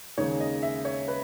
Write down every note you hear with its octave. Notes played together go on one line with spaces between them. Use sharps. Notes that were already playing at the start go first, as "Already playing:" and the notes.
D#2 C#3 G#3 D#4 C#5
D#5
E5
C#5
B4